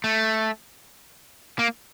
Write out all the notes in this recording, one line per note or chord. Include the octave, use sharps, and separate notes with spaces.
A3
A#3